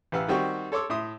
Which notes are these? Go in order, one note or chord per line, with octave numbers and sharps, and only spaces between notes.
A1 G4 B4 F5 F#5 E6
D#3 G3 C4 F#4 G4 C#6
A4 C#5 C6 D6 E6
A2 E5 C6 D#6